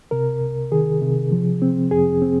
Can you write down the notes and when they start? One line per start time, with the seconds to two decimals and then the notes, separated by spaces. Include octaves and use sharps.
0.11 C3 A#4
0.41 C2
0.72 D#3 G#4
1.02 C3
1.32 F3
1.62 C4
1.91 F2 G#4
2.22 C4